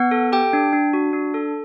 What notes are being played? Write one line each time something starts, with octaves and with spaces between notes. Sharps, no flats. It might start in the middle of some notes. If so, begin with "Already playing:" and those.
Already playing: B3 F#5
A4
G4 G5
D4
D4
F#4
D4
A4